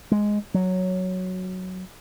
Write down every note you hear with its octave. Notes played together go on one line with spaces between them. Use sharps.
G#3
F#3